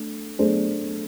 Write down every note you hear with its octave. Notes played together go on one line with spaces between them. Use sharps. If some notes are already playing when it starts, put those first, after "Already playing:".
Already playing: A3 D4
A3 D4 G#4 C5